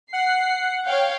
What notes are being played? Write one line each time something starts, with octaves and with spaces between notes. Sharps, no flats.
F#5 C7
C#5 F5 G5